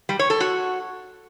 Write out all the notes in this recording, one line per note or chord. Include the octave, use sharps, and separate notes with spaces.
G3
C#5
A4
F#4